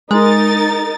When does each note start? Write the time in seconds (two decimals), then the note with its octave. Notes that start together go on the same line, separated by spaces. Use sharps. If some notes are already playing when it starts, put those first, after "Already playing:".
0.11 G#3 D#4 A#4 A6